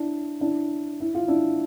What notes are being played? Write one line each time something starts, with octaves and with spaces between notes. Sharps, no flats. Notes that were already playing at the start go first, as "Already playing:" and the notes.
Already playing: D4 E4
D4 E4
E4
F4
D4 E4